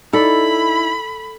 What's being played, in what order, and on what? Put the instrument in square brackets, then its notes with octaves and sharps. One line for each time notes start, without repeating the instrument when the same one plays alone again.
[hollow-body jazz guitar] D#4 D5 [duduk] E4 [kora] A4 [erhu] B5